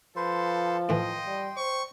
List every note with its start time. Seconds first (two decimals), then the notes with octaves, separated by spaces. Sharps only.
0.16 F3 A4 B4 C5 C6
0.89 A2 E3 D#5 G5 C6
1.26 G3
1.57 C5 C#6